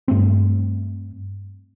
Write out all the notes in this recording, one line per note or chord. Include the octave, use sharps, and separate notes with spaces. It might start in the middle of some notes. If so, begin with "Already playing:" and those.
G2 A3 C4